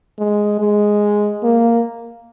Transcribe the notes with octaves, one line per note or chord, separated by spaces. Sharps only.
G#3
G#3
A#3